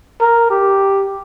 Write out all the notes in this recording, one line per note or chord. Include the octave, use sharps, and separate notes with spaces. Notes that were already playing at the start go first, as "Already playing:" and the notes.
A#4
G4